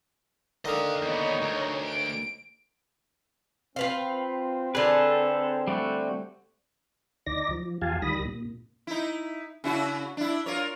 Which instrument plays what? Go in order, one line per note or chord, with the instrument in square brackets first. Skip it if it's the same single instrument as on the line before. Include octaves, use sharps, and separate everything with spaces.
[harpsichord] D3 D#3 [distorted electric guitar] D#5 F5
[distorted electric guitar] D#2 B3 [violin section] D#4 C#5
[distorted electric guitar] D2
[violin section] D7
[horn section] C4 [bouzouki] F4 B4 F5
[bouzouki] D3 G#4 [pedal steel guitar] A4 B4
[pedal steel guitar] G3 A3 F#4
[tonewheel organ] D2 D#4 D5 A#6
F3
E2 F4 G4 F5 G#5 A5
D2 D#3 G3 B5 D#6 A#6
A#2
[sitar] D#4 E4
C#3 E4 F#4
D4 E4
F4 A#4 C#5